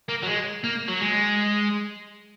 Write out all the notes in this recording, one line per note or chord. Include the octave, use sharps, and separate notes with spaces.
A#3
F#3
G#3
A#3
F#3
G#3